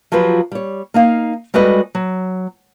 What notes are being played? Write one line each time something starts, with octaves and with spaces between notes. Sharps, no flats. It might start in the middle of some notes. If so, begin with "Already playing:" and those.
F3 F#3 F4 G4 B4
G3 C#5
A#3 D#4 F5
G3 G#3 F#4 A4 B4 D#5
F#3